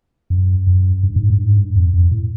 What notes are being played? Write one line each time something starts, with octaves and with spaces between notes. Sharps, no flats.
F#2
F#2
G2
G#2
G2
G#2
G2
F2
F2
A2